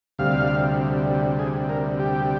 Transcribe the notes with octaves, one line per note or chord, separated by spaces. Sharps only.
D2 C3 G3 F5
G#4
A#4
G4